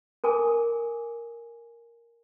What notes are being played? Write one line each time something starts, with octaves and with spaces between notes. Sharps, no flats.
A4 A#4 G#5 D6